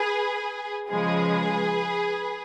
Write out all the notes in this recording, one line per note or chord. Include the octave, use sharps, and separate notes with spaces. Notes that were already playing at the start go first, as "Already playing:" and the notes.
Already playing: G#4 B4
C#3 F3 G#3 G#4 B4